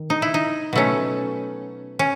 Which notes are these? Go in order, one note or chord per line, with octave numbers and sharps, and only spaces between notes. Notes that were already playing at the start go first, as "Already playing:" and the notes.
Already playing: D#3
D#4
E4
D#4
B2 F#3 A3 C#4
C#4